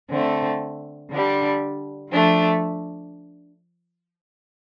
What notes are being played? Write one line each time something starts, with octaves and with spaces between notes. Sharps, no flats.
D3 A3 C4
D3 G3 D4
F3 A3 D4